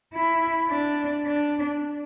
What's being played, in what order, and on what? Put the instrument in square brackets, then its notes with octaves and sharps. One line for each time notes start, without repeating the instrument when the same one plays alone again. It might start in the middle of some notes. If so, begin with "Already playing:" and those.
[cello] E4
D4
D4